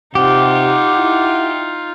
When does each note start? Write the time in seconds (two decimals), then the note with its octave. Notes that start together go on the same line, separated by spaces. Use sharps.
0.15 C3 D#4 F4 G4 F#5
0.95 E4